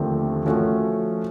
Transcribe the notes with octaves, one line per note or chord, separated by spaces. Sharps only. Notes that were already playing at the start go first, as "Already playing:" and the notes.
Already playing: D#2 D3 F3 A3 C4
F3 A3 C#4 F#4